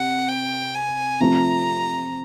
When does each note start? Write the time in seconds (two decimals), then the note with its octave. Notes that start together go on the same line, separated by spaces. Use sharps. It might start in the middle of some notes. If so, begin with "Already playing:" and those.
Already playing: C3 F#5
0.28 G5
0.74 G#5
1.20 C3 F3 A3 C4 F4 A#5